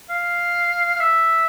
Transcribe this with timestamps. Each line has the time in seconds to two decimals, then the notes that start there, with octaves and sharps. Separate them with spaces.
0.10 F5
0.96 F5
1.00 E5